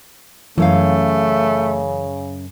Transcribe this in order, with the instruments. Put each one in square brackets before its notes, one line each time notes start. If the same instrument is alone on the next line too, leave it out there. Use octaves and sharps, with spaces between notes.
[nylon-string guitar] F#2 C#4 F5 [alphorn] C#3 [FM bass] E3 [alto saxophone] A3